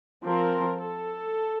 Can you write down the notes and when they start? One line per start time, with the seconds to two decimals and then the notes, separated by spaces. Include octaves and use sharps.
0.25 F3 C4 A#4
0.81 A4